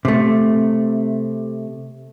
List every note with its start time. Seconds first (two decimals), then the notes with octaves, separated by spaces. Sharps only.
0.05 C3 A3